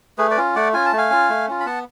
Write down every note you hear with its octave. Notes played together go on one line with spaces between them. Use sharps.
A3 G#4 B4
B4 D5
C#4 F4
A3 D5 F#5
C#4 F4 G#5
A5
A3
F5 G#5
C#4 F4
A3
C#4 F4
B5
B3 F#5 A5